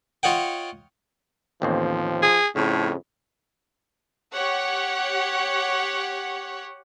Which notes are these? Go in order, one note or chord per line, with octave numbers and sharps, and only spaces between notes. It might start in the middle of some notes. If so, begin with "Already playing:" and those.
F4 C#5 D#5 F#5 G5
A1 D#2 F3 C4
G#4
F2 A2 C#3
G4 C#5 F#5